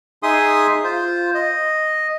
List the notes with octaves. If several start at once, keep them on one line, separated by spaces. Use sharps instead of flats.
D#4 G#4 E5 G#5 C6 D#6
F4 C5
D#5